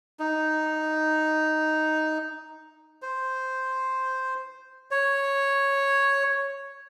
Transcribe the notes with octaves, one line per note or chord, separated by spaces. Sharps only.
D#4
C5
C#5